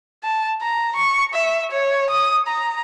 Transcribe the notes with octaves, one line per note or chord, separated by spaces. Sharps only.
A5
A#5
C#6
E5
C#5
D#6
A#5